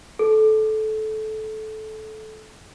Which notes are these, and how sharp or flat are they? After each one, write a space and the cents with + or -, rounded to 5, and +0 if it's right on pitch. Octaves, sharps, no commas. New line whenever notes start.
A4 -20